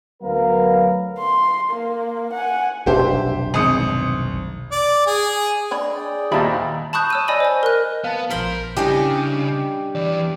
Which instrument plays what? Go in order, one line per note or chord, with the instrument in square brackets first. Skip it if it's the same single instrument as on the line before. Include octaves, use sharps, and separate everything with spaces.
[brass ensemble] D2 F#3 B3 A#4 B4 F5
[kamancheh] C6
A#3
F#5 G#5
[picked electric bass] F1 B1 D4 [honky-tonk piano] G4 C5 E5
[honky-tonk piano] G#1 D#6 C#7
[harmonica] D5
G#4
[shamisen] D4 C#5 B5 [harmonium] D#5
[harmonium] G#4 D5 G5
[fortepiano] D#2 A#2 [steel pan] G4 D#5 A5 [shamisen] C5 E5 B5
[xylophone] A5 B5 C#6 D#6 F#6 G6
C#5 E6 D#7
D5 D#5 G#5 B5 D#7
C5 G#5
A#4 D#5 F#6
[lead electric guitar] B3 [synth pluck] F5 A5
[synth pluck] A#1 F3 F6 [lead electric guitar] A#4 [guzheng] C5 B5 C6
[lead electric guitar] C#3 [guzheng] G3 D4 D#5 [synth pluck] E4 G#5 [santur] G4
[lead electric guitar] E2 E3 [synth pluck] D5